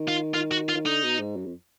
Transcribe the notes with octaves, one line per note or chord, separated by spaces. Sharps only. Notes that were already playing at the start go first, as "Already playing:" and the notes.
Already playing: D#3
F4
D#3 F4
F#4
F4
D#3
D3 D#4
B2
G#2
F#2
F2